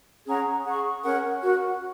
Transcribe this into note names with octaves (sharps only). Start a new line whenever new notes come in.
C#4 G#4 F#5 A#5
G#4 F#5 C#6
C#4 A#4 F#5
F#4 A#4 F#5